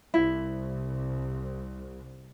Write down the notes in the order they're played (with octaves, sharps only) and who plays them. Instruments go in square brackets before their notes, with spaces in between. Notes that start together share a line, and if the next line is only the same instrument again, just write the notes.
[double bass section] C2 [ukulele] E4